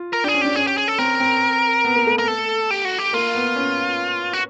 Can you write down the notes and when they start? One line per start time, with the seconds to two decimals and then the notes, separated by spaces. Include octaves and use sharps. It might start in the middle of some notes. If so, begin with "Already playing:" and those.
Already playing: F4
0.13 A#4
0.24 D4 G4
0.28 G#4
0.34 C#4
0.41 D4 G4
0.56 C#4 G#4
0.67 G4
0.78 G#4
0.88 A4
0.98 C4 A#4
1.20 C4
1.85 B3
1.96 A#3
2.07 A3
2.19 A#4
2.28 A4
2.71 G4
2.85 F#4
2.99 G4
3.13 A#3 F4
3.35 B3
3.56 C#4
4.33 F#4